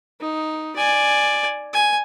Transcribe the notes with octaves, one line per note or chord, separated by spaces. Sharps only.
D#4
D5 G#5
G#5